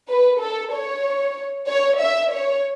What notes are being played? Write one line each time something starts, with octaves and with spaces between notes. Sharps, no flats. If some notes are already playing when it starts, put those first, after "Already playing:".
B4
A4
C#5
C#5
E5
C#5